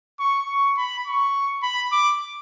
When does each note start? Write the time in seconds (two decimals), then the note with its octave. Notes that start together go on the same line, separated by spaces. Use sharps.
0.19 C#6
0.48 C#6
0.77 B5
1.06 C#6
1.63 B5
1.92 D6